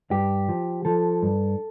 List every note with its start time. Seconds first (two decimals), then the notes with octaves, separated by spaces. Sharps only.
0.11 G2 G4
0.49 F3
0.85 F3 A4
1.22 G2